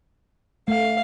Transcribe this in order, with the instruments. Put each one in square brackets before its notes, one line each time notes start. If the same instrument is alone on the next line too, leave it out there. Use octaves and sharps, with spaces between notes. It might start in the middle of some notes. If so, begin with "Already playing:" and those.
[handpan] A3 [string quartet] F5